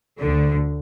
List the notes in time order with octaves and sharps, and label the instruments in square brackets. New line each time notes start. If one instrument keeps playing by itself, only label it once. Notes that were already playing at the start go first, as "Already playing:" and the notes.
[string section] D2 D3